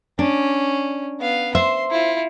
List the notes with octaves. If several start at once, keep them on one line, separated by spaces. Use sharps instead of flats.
C#4 D4
B3 F5
C5 E5 C6
E4 F4